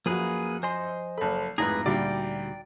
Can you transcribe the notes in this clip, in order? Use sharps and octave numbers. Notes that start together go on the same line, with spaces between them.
F#2 F3 A#3 F#4 G#4 B4
C5 D#5 G#5 C6
F#1 A4 A5 B5
G#1 F2 A2 D#4 G#4 B4 A#5 A#6
D2 A#2 D3 G3 F#4 D5 G5